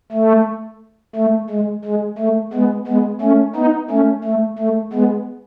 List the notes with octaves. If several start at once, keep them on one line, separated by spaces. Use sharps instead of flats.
A3
A3
G#3
G#3
A3
G#3 B3
G#3 B3
A3 C#4
B3 D#4
A3 C#4
A3
A3
G#3 B3